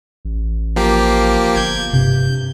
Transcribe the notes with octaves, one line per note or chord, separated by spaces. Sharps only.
A1
F3 A#3 G4
G1 G6 G#6
G2 C3 G6